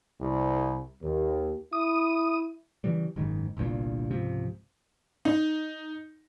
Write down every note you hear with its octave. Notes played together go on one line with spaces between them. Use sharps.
C2
D#2
E4 D#6
C#3 E3 G3
F#1 G#2 D#3
G1 C2 G2 A#2
C#2 G#2 C3 F3
D#4